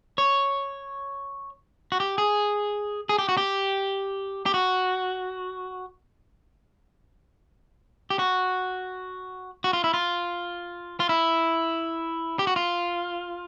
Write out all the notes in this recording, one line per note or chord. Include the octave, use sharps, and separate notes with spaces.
C#5
F#4
G4
G#4
G#4
G4
F#4
G4
G4
F#4
G4
F#4
F#4
F4
E4
F4
F4
E4
G4
F#4
F4